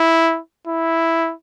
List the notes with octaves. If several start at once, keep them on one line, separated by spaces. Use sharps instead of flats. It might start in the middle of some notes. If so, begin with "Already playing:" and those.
Already playing: E4
E4